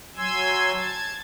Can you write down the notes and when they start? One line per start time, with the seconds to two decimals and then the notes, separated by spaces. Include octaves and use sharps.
0.17 F#3 G#5 C6 E6 G#6
0.73 A5 G#6